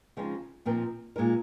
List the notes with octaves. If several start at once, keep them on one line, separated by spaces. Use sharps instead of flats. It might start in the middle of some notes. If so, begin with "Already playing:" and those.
C#3 F3 G#3 C4 D#4
A#2 F3 C4 D#4 A#4
A#2 G#3 D#4 A#4